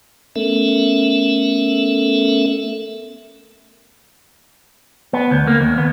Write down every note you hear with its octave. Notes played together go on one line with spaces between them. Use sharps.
A3 B3 C#4 A4 A#4 E5
B3
D2
A#3
D#2
B3